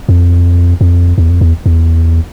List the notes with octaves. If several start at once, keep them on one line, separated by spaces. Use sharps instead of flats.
F2
F2
E2
F2
E2
E2